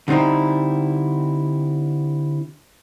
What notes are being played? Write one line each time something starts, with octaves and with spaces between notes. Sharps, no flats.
D3 G3 C4 D#4 E4